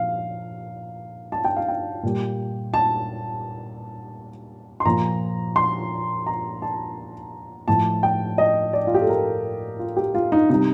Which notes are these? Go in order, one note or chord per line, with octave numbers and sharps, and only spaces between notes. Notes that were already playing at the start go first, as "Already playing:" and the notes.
Already playing: A#2 F3 F5
A5
G5
F5
G5
A#2 G3
A5
C6
A#2 F3 A#5
C6
A#5
A5
A2 F3 A5
G5
D#5
D5
F4
G4
A4
A#4
F4
G4
F4
D#4
C3 G3 D#4